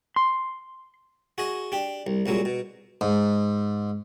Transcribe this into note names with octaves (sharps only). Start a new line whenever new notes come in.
C6
F#4 G#4 D#5
D4 G4
C2
C2 A#2 F#3 G#3
B2
G#2